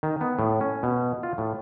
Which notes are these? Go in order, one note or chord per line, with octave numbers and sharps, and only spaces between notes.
D#3
B3
A2
C#4
B2
F4
A2